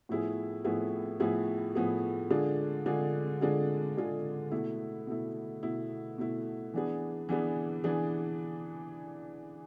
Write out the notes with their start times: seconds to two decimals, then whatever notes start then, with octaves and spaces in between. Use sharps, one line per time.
0.09 A2 F3 B3 E4 G#4
0.64 A2 F3 B3 E4 G#4
1.20 A2 F3 B3 E4 G#4
1.75 A2 F3 B3 E4 G#4
2.30 D3 G#3 D4 F4 G#4
2.86 D3 G#3 D4 F4 G#4
3.41 D3 G#3 D4 F4 G#4
3.97 D3 G#3 D4 F4 G#4
4.52 B2 A3 E4
5.07 B2 A3 E4
5.63 B2 A3 E4
6.18 B2 A3 E4
6.74 E3 B3 D4 G#4
7.29 E3 B3 D4 G#4
7.84 E3 B3 D4 G#4